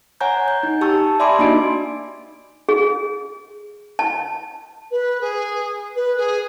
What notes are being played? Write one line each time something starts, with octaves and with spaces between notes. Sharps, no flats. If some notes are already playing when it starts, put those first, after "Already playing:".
C#5 F#5 G#5 A#5 G6
G6
D#4
G4 A5 C#6 E6
D5 E5 G#5 B5 C6 D6
A#3 D4 D#4 F#4 D#5 D7
G#4
A5
B4
G#4
B4
G#4